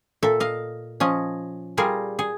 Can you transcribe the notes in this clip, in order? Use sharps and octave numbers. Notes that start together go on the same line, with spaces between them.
A#2 A4 E5
D#5 F5
F3 C#4 D#5
G3 F4 G#4 A#4
G#4